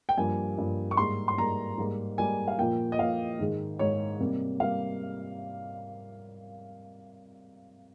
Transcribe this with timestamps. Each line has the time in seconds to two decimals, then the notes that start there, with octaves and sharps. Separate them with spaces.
0.09 G5
0.17 G2 F3 A#3 G#5
0.57 G2 F3 A#3
0.91 C#6
0.97 G#2 G3 A#3 C6
1.28 C6
1.38 G#2 G3 A#3 A#5
1.78 G#2 G3 A#3
2.18 G#2 G3 A#3 G#5
2.48 F5
2.58 A#2 F3 A#3 G5
2.92 D#5
2.99 A#2 F3 A#3 F5
3.39 G#2 D#3 G#3
3.79 G#2 D#3 G#3 C#5
4.20 C3 G3 A#3
4.60 C3 G3 A#3 F5